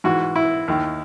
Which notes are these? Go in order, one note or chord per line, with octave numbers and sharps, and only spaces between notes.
G#2 E3 F#4
E4
D#2 D#3